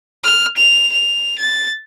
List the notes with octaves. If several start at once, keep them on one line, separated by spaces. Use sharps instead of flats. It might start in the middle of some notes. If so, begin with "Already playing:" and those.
F6
F7
F7
A6